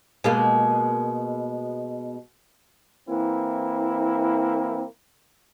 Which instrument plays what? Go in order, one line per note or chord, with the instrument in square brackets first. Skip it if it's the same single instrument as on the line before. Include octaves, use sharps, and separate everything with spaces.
[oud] B2 G#3 A#3
[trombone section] E3 A#3 C4 E4